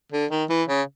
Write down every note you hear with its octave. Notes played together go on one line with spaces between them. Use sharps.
D3
D#3
E3
C#3